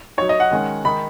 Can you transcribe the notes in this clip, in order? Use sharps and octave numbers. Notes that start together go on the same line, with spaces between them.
F#3 D#4 C#5
D#5
F#5
D#3 G#3 C#4
D#3 G#3 D#4 B5